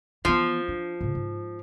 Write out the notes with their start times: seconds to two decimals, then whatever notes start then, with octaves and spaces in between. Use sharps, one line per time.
0.25 E3 F3 B3
0.68 D4
1.01 A2 C#3
1.15 G#2